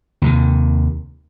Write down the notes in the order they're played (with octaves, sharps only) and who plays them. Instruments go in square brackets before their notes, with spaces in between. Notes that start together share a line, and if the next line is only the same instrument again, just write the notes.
[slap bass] D#2 C3 D#3